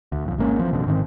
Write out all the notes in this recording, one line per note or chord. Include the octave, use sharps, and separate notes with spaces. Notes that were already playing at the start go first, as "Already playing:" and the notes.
D2
B1 F2
G#1 G#3 A#3 C#4
E3 F3 C4
A1 F2 B2 D3
G#2 D#3 E3 C4